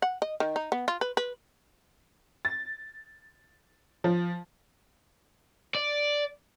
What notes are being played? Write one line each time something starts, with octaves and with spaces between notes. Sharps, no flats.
F#5
D#5
D#3
D#4
B3
F4
B4
B4
A6
F3
D5